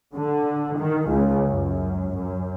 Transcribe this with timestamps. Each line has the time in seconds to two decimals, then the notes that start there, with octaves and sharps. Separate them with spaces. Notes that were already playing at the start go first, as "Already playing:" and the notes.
0.14 D3
0.78 D#3
1.08 C#2
1.45 F#2
2.14 F#2